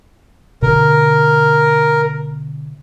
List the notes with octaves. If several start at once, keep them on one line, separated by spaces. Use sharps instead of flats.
B2 D3 A#4